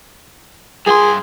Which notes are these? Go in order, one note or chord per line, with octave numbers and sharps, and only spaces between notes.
G2 G#4 C6